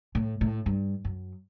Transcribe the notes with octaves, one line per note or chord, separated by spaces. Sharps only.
A2
A2
G2
F#2